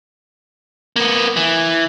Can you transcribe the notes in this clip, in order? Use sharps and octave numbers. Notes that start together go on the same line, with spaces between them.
A#3 B3
E3